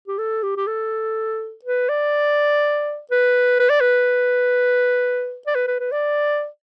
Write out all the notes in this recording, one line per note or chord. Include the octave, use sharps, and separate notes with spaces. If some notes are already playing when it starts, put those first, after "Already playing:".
G4
A4
G4
G4
A4
B4
D5
B4
B4
D5
B4
D5
B4
B4
B4
D5